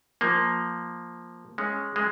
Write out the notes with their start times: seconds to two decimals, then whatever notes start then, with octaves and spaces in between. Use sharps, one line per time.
0.21 F3 A#3
1.58 G#3 C#4
1.96 G#3